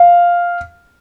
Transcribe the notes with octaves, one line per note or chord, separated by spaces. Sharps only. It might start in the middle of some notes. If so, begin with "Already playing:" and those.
Already playing: F5